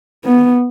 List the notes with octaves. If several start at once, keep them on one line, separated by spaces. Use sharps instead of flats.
B3